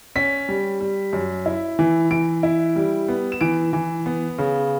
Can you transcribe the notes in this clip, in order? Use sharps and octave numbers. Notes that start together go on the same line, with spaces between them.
C#4 B6
G3
G3
F#2
E4
E3
E3 D7
E4
G3
B3
E7
E3 D7
E3
B3
C#3